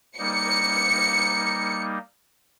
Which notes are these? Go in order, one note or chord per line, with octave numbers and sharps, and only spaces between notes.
G3 A#3 D#4 C#7